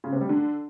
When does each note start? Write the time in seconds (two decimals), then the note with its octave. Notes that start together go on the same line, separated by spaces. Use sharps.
0.04 C#3
0.12 C3
0.21 G3
0.29 D3